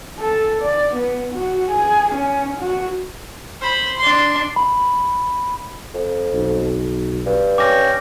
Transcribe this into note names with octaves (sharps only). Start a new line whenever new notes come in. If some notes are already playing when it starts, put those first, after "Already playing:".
A4
D5
B3
F#4
G#4
C#4
F#4
C5 B5
D4 C6
B5
F2
B1
G2
C#4 G5 D6 A#6